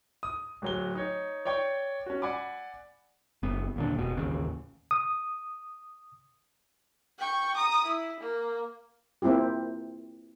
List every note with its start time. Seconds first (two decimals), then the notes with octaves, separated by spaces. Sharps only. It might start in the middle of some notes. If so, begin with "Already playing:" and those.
0.23 D#6
0.62 D1 F#3 G7
0.95 D#4 C#5
1.45 C#5 D5 G5 C#6
2.06 C#4 F#4
2.22 D5 F#5 G#5 B5 D6
3.43 F#1 B3
3.76 D#2 A#2 D3
3.95 F1 B2
4.17 A1 D#2 C#3
4.91 D#6
7.18 G5 C#6
7.56 A#5 D#6
7.86 E4
8.20 A#3
9.22 A#3 C4 E4 F4 G4